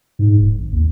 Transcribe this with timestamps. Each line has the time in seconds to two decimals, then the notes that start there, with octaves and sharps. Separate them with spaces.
0.19 G#2
0.37 D1
0.58 G#1
0.73 D#2